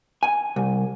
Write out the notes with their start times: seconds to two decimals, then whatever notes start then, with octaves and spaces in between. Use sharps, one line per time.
0.23 G#5
0.56 C2